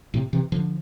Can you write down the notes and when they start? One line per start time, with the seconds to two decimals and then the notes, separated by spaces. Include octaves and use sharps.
0.14 A2 C3
0.33 C3 E3
0.52 D3 F3